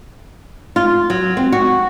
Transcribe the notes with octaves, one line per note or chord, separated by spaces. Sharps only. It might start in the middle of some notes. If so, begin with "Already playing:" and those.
F4
F#3
C4
F#4